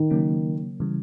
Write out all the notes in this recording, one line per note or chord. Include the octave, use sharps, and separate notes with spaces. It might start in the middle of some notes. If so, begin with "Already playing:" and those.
Already playing: D#3
C#3 F#3 A#3 C#4
C#3 E3 G3